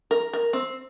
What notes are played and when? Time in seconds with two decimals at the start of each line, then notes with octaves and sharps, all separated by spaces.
0.11 A#4
0.33 A#4
0.53 C4